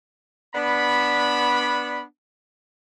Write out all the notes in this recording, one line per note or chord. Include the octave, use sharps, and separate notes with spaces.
B3 D4 B5